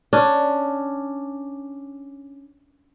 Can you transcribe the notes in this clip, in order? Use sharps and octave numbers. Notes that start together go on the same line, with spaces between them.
C#4 D4